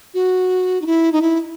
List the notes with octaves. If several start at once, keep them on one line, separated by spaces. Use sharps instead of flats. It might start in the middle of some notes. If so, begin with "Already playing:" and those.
F#4
D#4
E4
D#4
E4